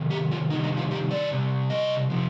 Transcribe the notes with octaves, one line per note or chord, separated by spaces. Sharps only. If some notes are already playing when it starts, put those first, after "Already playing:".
Already playing: C3 D#3
G4
F4
C3 D#3 G3 D#4
D#4
F4
G4
D5
C3 G3
D#5
C3 F3